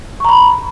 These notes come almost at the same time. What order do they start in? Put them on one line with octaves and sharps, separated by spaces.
C#6 A#5 B5